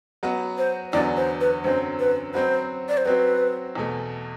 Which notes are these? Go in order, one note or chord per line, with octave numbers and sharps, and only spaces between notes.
F#3 B3 F#4
C5
E2 D3 F#3 B3 F#4 D5
C5
B4
F#2 D3 F#3 C4 C5
B4
F#3 C4 F#4 B4 C5
D5
C5
F#3 C4 F#4 B4
E2 B2 A3